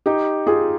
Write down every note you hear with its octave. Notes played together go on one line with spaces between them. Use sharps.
D#4 G4
F4 G#4